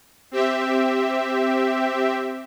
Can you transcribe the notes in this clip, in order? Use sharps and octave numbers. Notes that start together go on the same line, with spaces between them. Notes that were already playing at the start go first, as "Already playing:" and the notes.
C4 G4 E5